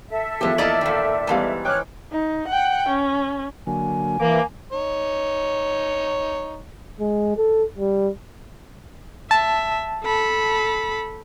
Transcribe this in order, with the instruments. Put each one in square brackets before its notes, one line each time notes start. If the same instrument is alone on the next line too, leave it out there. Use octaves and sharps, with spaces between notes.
[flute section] A4 E5
[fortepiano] E2 F3 [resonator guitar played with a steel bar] G#3 G4
[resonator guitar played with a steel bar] A#3 E4 D#5 [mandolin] D5
[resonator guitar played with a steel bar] A#2 D#3
[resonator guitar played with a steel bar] G#2 E3 F5 [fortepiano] G3 B3 A5
[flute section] C#5 F6 F#6 [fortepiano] G5 G#5 D6
[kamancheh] D#4
F#5 G5
C#4
[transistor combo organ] D3 F#3 A#3 [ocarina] G#5
[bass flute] E3 [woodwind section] A#3 [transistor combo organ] B4 D6
[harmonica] D#4 C#5
[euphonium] G#3
A4
G3
[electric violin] E5 [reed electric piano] A5
[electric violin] A4 B5